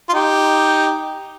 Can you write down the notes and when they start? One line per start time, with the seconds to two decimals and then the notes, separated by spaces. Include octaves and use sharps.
0.09 F4
0.13 D#4 G4